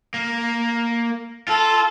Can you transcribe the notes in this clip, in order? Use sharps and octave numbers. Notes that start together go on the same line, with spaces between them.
A#3
F4 A4